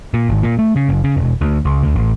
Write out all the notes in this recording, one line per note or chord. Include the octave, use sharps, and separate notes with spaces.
A#2
G#1
A#2
A3
C#3
F#1
C#3
E1
D2
C#2
D2
A1